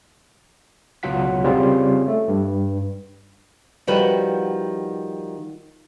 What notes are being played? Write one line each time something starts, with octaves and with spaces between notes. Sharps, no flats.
C#2 B2 F#3 F4 F#5 B6
C#3 G3 C4 C#4 F4
A3
G2
D#3 F3 G3 F#4 B4